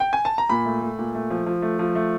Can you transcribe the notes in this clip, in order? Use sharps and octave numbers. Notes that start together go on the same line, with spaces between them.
G5
G#5
A5
A#5
A#2 B5
A3
A3
A#2
A3
F3
F3
A3
F3
A3